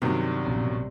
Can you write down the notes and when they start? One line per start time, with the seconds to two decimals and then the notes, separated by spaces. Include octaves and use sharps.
0.02 G2 C3 D#3 F#3 G3
0.45 A#1 B2 C#4